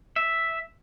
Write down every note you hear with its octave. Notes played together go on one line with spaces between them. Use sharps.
E5